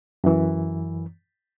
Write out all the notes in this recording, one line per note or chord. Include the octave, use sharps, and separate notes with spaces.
F#2 E3